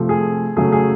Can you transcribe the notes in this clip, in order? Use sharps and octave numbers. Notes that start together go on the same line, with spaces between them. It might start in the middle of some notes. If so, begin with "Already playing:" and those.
Already playing: C3 F3 A3
G#4
C#3 F#3 A3 G#4
G#4